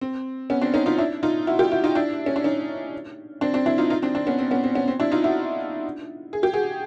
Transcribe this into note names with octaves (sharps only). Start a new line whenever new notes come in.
C4
B3 C#4
C4 D4
C#4 D#4
D#4 F4
D4 E4
D#4 F4
E4 F#4
F4 G4
E4 F#4
D#4 F4
D4 E4
C#4
D4
C#4 D#4
C4 D4
C4 D4
D4 E4
D#4 F4
D#4 F4
C4 D4
C4 D4
B3 C#4
C4
B3 C#4
C4
B3 C#4
C4
D4 E4
D#4 F4
E4 F#4
G#4
G4
F#4 G#4